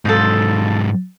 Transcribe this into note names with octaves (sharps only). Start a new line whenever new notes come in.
G#2 F#3 D#4 F4 A4